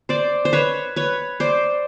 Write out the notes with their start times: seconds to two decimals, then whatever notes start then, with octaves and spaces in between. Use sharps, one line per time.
0.09 C5 D5
0.45 C5
0.53 B4 C#5
0.96 B4 C#5
1.40 C5 D5